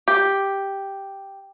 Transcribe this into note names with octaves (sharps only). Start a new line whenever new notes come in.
G4